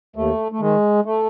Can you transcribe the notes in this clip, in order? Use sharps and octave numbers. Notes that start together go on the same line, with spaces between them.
D#2 A3
A3
D#3 G#3
A3